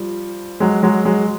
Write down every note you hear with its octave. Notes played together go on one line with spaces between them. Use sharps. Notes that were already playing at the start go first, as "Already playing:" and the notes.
Already playing: F3 G3
F#3 G#3
F#3 G#3
F#3 G#3